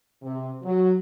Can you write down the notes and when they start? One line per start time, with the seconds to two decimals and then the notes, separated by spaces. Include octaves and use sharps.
0.22 C3
0.63 F#3